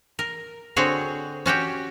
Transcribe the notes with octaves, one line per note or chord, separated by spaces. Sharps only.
A#4
D3 C4 F#4 G#4 C#5
C#4 F#4 G4 G5